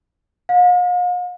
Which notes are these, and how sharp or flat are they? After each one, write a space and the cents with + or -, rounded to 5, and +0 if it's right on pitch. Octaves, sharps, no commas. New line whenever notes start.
F5 +45